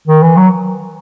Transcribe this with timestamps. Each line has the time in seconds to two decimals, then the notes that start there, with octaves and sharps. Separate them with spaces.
0.07 D#3
0.23 E3
0.36 F#3